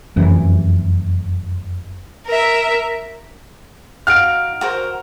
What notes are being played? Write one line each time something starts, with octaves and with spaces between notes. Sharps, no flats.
F1 F#2 E3
A#4 E5
D#4 F#4 F5 F6 D7
F#4 A#4 C5